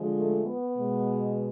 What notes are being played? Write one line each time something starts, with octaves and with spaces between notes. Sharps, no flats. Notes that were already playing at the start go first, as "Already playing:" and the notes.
Already playing: D3 F3 G#3
A3
B3
B2 G#3